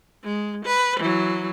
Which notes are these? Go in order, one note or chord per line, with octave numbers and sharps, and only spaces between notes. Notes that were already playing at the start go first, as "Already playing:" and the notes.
G#3
B4
E3 F#3